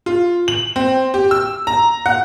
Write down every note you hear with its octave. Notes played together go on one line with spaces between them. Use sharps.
F4
F#7
C4
G4
E6
A#5
F#5